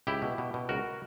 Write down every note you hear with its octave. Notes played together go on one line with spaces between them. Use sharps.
C#2 E4 G4
B2
B2
B2
C#2 F#4 A#4